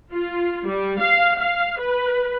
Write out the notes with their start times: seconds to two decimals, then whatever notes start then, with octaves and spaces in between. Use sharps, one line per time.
0.11 F4
0.66 G3
0.99 F5
1.38 F5
1.79 B4